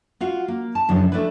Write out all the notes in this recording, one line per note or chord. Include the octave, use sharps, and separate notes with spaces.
F4 F#4 F5
A#3
A5
F#2 C#3 E3 F3 D4
A3 D4 E4 B4